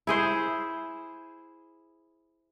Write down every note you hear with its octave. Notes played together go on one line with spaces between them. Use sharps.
E4 G#4 C5